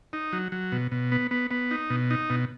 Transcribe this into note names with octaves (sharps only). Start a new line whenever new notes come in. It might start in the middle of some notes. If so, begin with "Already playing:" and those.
D#4
F#3
F#3
B2
B2
B3
B3
B3
D#4
B2
D#4
B2